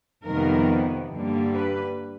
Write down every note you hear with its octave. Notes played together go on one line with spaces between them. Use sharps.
F2 C3 D#3 G3 B3 A#4
G2 D3 G3 A#3
B4